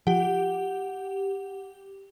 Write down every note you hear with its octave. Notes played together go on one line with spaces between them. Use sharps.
F3 G4 F#5